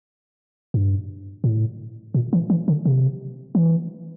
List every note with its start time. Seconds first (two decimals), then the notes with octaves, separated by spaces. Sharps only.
0.74 G2
1.44 A2
2.14 A#2
2.33 E3
2.50 E3
2.68 D3
2.85 C3
3.55 E3